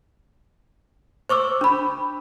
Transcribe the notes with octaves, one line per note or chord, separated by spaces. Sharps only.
C5 C#6 D6 E6
D4 B5